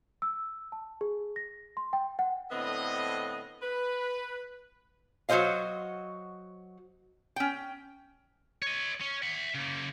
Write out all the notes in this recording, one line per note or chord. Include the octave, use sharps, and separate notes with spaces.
E6
A5
G#4
A#6
C6
G5
F#5
A2 D3 B3 C4 D#5
B4
F#3 F#4 A4 C5 D#5 F5
C#4 G5
C#5 D#5
C#4
E5 F#5
C#3 A#3